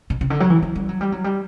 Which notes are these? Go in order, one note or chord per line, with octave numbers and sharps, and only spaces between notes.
B2
C3
D3
F#3
E3
F#3
G3
F#3
G3
F#3
G3